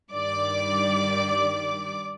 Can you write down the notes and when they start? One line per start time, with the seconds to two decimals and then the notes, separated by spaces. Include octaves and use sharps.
0.12 G2 D#3 G3 D5 D6